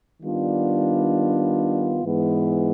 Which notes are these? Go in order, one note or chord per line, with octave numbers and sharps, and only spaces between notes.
D#3 G3 B3 D4 F4
G#2 E3 G#3 B3